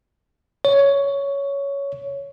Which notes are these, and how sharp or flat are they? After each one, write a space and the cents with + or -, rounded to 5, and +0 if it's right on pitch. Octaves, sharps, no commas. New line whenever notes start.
C#5 +10